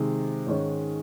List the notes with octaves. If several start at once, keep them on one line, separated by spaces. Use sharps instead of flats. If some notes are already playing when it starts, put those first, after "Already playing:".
Already playing: C3 D#3 G#3
G#2 D#3 G#3 C#4